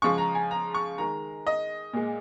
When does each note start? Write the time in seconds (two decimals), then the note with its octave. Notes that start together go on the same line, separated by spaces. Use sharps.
0.02 C#3 F3 G#3 C#6
0.18 A#5
0.35 G#5
0.51 A#5
0.74 C#6
0.98 D#3 G#3 A#5
1.47 D#5
1.93 A#2 G#3